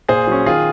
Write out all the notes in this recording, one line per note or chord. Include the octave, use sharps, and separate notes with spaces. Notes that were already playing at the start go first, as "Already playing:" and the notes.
A#2 G#4 C5
F#3 C#4
D#3 F4 G#4